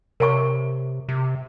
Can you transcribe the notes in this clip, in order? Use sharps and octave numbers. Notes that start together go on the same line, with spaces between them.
C3 A#4 C#5 G#5 C#6
C3